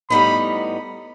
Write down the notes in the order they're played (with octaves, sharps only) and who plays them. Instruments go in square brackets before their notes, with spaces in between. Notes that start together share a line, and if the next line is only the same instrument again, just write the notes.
[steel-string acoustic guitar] A2 G3 B3 D#4 [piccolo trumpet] B5